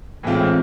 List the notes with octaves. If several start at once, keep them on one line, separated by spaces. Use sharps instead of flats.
A2 E3 G#3 C4 F4